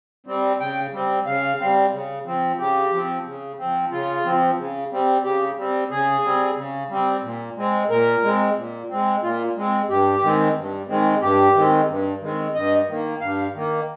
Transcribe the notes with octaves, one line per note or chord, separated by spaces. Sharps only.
G3 C4
C#3 G5
G3 C4
C#3 F5
G3 C4
C#3
F3 C4
C#3 G4
F3 C4
C#3
F3 C4
C#3 F4
F3 C4
C#3
G3 C4
C#3 G4
G3 C4
C#3 G#4
G3 C4
C#3
G3 C4
A#2
G#3 C4
A#2 A#4
G#3 C4
A#2
G#3 C4
A#2 F4
G#3 C4
G2 G4
D#3 G#3 C4
G2
D#3 G#3 C4
G2 G4
D#3 G#3 C4
G2
D#3 G#3 C4
G2 D#5
D#3 A#3
G2 F5
D#3 A#3